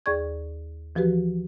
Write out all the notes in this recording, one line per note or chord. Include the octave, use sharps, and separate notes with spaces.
D#2 G#4 D5 C#6 G#6
E3 F3 F#4 G4 B4